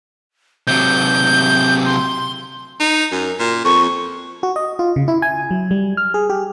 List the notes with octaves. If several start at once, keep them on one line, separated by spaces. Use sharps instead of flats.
C3 F#3 G6
C6
D#4
F#2
A#2
F2 C#6
F#4
D#5
F4
C#3
E4
G#5
F#3
G3
F6
G#4
G4